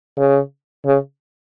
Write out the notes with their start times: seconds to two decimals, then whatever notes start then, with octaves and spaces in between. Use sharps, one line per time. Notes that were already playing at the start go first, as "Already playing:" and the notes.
0.18 C#3
0.85 C#3